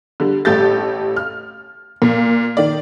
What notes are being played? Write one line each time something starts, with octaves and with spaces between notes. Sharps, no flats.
D3 G3
A1 G3 A3 G4 G6 A6
F6
A#2
D#3 D5